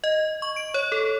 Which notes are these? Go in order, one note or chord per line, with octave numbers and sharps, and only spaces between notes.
D#5
C#6
D7
C#5
A4